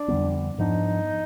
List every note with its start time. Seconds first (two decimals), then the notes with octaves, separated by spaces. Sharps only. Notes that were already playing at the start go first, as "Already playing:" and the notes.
Already playing: D4
0.08 F2 D3 G3 B3
0.58 G#2 F3 B3 D4 D#4